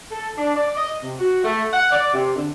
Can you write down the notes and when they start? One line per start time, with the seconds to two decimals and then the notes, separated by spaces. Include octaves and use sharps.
0.10 A4
0.37 D4
0.56 D5
0.77 D#5
1.03 C3
1.19 F#4
1.44 A3
1.73 F#5
1.91 D5
2.13 C3
2.36 D3